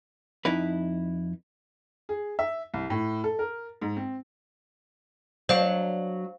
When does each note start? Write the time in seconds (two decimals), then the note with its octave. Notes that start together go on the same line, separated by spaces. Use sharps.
0.45 F2 D#4 E4 B4
2.09 G#4
2.39 E5
2.74 C2
2.90 A2
3.24 A4
3.39 A#4
3.81 G#2
3.97 C4
5.49 F#3 D4 C5 F5